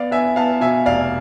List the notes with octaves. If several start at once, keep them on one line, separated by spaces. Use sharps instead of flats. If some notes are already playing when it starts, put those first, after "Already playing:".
Already playing: B3 D5 F5
B3 E5 G#5
B3 F5 A5
B2 E5 G#5
F1 D5 F5